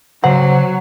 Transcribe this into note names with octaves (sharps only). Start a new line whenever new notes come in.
C#3 F#3 C5 F#5 A#5